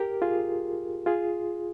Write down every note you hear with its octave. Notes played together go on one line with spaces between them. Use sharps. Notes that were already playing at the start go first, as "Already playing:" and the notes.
Already playing: G4 A#4
F4 G#4
F4 G#4